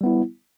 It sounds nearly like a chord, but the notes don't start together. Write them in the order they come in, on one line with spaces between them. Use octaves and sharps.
G3 B3 E4